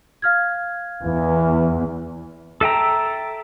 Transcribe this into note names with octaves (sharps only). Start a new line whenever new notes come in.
F5 F6 G#6
E2 E3
A4 E5 G5 A#5